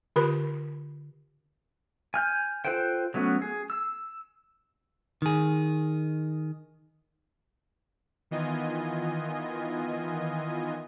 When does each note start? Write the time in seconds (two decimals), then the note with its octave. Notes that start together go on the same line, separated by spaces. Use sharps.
0.16 D3 F4 G4 A#4 B4 B5
2.14 G#5 F6 G6
2.65 F4 A4 B4 C5 G5
3.14 F#3 A3 B3 C#4
3.42 G#4
3.70 E6
5.22 D#3 G#4
8.31 D#3 E3 B3 F4 D#5 G#5